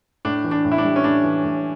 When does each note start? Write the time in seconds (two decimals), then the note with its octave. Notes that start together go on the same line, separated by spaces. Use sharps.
0.25 A2 D4
0.44 E3
0.51 D4
0.65 A2
0.72 E4
0.78 D4
0.84 G3
0.96 C#4
1.04 A2 D4
1.24 E3
1.44 A2